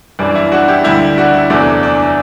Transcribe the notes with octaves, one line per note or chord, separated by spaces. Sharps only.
F#2 E3 G3 D4
E4
D4 F#4
E4 G4
D2 D3 G3 E4 G4
D4 F#4
E4
E2 C3 F#3 A3 D4
D4